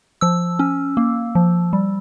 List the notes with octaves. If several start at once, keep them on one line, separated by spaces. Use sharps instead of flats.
F3 E6
C#4
A#3
F3
G3